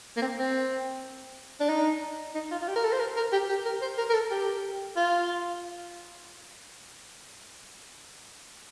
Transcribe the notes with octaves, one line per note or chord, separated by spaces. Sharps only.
A#3
C4
C4
D4
D#4
D#4
F4
F4
G4
A#4
A4
C5
A#4
A#4
G4
G4
A#4
C5
A#4
A#4
A4
G4
F4